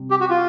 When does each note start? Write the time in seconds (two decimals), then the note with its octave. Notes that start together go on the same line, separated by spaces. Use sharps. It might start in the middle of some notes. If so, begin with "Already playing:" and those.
Already playing: C3 G3
0.10 G4
0.20 F#4
0.30 F4